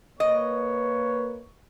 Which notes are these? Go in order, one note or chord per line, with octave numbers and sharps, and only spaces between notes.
A#3 B4 C#5 D#5